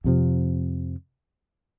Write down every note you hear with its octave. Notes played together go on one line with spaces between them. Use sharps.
F2 C3 F3